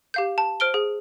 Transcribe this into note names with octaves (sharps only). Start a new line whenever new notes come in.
G4 F5 G6
A5
C5 F6 D7 G7
G#4